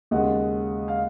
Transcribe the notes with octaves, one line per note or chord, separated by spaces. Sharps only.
D#2 C#3 G#3 D#5 F#5
F5